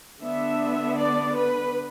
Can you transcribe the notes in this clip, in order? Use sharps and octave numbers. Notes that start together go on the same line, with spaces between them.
D3 B3 D4 E5
D5
B4